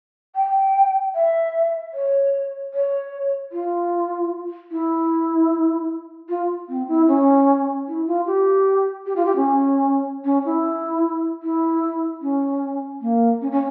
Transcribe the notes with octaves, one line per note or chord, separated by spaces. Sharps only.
G5
E5
C#5
C#5
F4
E4
F4
C4
E4
C#4
E4
F4
G4
G4
F4
G4
C#4
C#4
E4
E4
C#4
A#3
C#4
C#4